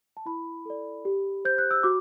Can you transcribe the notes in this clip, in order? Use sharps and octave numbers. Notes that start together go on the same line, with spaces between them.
A5
E4 B5
A4 D5
G4
C5 G6
F#6
E6
F#4 D6